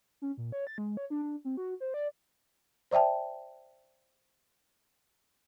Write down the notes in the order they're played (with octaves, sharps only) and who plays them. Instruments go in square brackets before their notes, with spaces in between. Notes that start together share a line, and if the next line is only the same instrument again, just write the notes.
[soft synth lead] C#4
A#2
C#5
A6
G#3
C#5
D4
D4
C4
F#4
C5
D5
[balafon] C5 D5 E5 G5 A5